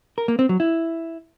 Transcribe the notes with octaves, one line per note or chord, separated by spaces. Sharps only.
A#4
A#3
C4
F#3
E4